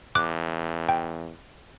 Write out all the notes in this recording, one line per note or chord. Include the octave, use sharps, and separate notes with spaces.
E2 D6 F#6
G5